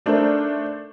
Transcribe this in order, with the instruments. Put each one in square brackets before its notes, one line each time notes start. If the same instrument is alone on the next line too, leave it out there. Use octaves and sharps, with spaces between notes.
[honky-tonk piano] A3 D4 C5 [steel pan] D#4 A4 A#4